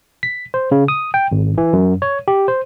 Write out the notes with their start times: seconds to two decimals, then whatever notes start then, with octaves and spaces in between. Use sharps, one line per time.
0.23 B6
0.54 C5
0.72 C#3
0.88 D#6
1.14 G5
1.32 G#1
1.58 E3
1.73 F#2
2.02 C#5
2.28 G4
2.48 C5